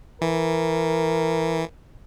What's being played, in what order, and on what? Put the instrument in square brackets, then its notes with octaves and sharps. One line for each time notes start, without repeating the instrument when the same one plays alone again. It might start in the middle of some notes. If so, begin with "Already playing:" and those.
[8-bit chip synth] E3 [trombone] A#4